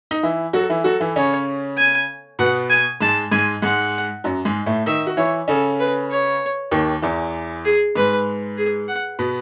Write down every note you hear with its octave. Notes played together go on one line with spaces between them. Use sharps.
D#4
E3 E4
F#3 F#4 A4
E3 E4
F#3 F#4 A4
E3 E4
C#3 C#4 C#5
G#5
B2 B3 F#5
G#5
G#2 G#3 A5
G#2 G#3 G#5
G#2 G#3 F#5
F#2 F#3
G#2 G#3
A2 A3
D#3 D#4 E5
F#4
E3 E4 C#5
C#3 C#4 A4
B4
C#5
D#2 D#3
E2 E3
G#4
G#2 G#3 B4
G#4
F#5
B2 B3